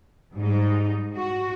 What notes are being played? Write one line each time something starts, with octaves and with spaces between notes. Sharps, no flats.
G#2 G3 D#4
F#4